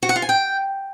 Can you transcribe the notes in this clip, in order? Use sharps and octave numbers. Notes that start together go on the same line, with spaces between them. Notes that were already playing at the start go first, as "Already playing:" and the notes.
F#4
F#5
F4
G#5
G5